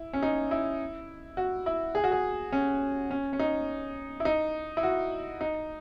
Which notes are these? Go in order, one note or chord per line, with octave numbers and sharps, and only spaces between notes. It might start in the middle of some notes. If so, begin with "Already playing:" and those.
Already playing: E4
C#4
D#4
E4
F#4
E4
G#4
F#4
G#4
C#4
C#4
C#4
D#4
E4
D#4
E4
F#4
D#4